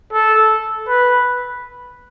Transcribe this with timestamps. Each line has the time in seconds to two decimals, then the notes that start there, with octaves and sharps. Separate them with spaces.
0.12 A4
0.88 B4